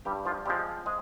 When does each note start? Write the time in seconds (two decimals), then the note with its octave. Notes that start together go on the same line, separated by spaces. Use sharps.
0.05 G2 G3 G4
0.25 F3 F4
0.46 F3 G3 G#3 C4 G4
0.86 G#3 G#4